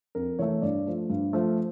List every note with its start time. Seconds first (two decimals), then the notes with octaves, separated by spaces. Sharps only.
0.15 F2 A#4
0.39 E3 A3 C#5
0.62 G2 D5
0.86 F3 A3
1.10 G2
1.33 F3 A3